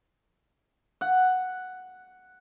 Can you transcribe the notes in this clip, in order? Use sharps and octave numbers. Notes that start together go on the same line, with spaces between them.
F#5